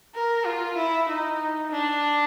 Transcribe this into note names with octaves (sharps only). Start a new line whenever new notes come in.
A#4
F4
E4
D#4
D4